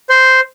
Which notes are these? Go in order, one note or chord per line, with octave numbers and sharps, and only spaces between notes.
C5